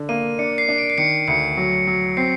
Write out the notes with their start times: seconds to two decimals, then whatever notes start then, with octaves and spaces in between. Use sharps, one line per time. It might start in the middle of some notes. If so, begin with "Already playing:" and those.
Already playing: D3
0.09 A#3 D#7
0.39 D4 C#7
0.58 C7
0.69 D4
0.78 D7
0.90 C7
0.98 D#3 C#7
1.28 D2 C#7
1.57 F#3
1.87 F#3
2.17 C4 C7